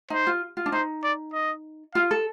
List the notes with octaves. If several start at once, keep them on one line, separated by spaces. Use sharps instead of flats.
D#4 C5
F4
F4
D4
D#4 C5
D5
D#5
F4 F5
A4